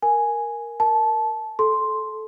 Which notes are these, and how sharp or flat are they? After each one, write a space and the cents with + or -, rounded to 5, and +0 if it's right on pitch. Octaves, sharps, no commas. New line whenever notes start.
A#4 +0 G#5 +0
A#4 +0 A5 -20
A4 -15 C6 +0